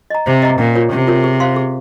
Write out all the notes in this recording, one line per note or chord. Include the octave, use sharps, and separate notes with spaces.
D#5 A#5
C3 C5
D#5 A#5
A#2 C#4
F4 A#4 C#5
C3 C#4
F4 A#4 C#5
G#4
C5 F5 C6
G#4